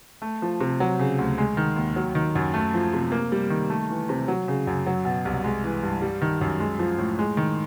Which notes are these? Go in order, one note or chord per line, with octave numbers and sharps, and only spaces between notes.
A3
F3
C3
F#3
C#3
D2
G#3
D#3
D#2
F#3
D#3
F#2
A3
F3
C3
A#3
G3
D#3
A3
E3
C3
F#3
C#3
F#2
F#3
B2
C2
G#3
E3
G2
G3
D#3
F#2
G#3
F3
A2
G#3
D#3